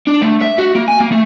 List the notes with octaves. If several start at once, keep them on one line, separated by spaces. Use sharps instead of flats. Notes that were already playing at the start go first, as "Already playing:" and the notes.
D4
A3
E5
F#4
A#3
G#5
A#3
A3